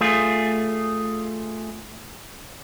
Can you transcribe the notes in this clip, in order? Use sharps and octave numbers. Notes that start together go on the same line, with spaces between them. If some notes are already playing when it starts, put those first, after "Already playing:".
A3 F4 G#4